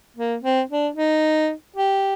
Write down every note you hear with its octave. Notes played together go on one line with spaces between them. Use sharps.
A#3
C4
D4
D#4
G4